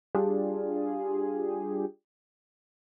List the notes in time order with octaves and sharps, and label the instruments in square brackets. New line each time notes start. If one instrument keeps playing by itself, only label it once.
[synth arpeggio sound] G3 D4 F4 G4 G#4